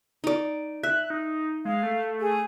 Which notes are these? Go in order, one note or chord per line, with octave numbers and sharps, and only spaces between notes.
D#4 D5
E5 F#6
D#4
G#3 F5
A3
G#4